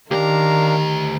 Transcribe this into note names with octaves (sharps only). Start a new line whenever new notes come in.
D2 D#3 D4 G4 A#4 F5 A#5